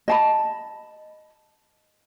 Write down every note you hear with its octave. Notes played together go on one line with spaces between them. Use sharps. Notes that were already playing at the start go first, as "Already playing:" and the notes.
D#5 A5 B5